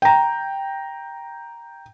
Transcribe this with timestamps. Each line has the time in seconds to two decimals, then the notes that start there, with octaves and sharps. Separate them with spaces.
0.02 G5 A#5